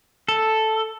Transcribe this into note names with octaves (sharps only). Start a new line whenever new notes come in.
A4